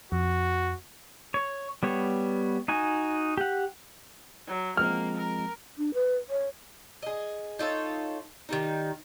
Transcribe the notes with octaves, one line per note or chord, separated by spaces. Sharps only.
F2 F#4
C#5
G3 B3 C#5
D#4 F#4 G#5
G4 F#5
F#3
F3 G#3 A#3 C4 F6
A#4
D4
B4
C#5
G#4 D#5
D#4 F4 A4 C#5
D#3 G3 D#4